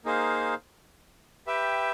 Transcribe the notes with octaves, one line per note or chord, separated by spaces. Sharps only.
A#3 D#4 G#4 C5 F5
G4 B4 E5 G5